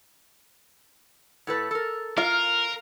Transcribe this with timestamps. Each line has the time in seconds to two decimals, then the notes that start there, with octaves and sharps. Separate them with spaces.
1.47 A2 A4 B4
1.71 A4 A#4
2.17 F4 A#4 F5